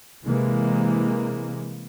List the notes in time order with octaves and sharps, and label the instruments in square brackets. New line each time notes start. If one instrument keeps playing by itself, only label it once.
[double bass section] C3 E3 G#3 A#3